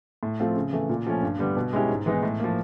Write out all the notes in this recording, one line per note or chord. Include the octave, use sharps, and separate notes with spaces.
A2
F3 A3 C4 F4
C#3
E3 A3
A#2
F3 A3 C#4
G2
D3 G3 B3
B2
G#3 C#4 E4 G4
G#2
E3 G#3 B3 D#4
A2
F3 A#3